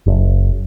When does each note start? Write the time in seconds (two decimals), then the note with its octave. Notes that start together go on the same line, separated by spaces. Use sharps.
0.06 F#1